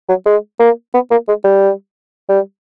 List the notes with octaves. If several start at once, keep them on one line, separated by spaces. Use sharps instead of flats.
F#3
G#3
A#3
B3
A#3
G#3
G3
G3